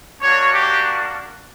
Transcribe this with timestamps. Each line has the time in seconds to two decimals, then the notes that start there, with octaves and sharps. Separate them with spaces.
0.21 A#3 D4 F#4 C#5
0.53 G4